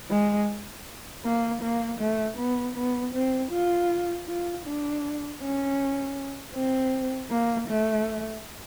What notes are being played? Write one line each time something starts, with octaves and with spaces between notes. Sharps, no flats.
G#3
A#3
A#3
A3
B3
B3
C4
F4
F4
D4
C#4
C4
A#3
A3